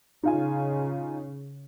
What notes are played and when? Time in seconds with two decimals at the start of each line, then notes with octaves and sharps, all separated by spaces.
0.23 C#3 D#4 F4 G#5